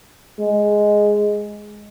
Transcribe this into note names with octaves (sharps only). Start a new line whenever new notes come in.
G#3